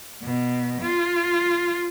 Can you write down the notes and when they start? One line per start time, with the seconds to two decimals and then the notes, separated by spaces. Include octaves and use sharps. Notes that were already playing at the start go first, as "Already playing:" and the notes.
0.23 B2
0.82 F4